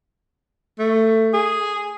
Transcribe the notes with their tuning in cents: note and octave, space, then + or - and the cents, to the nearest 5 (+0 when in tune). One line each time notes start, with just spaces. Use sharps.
A3 +15
G#4 -5